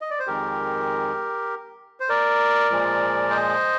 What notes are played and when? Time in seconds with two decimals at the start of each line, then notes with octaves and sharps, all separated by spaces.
0.01 D#5
0.10 D5
0.19 C5
0.27 F2 D#3 G#3 G4 A#4
2.00 C5
2.09 A#4 D5
2.70 A#2 F3 G#3
3.30 C5 D#5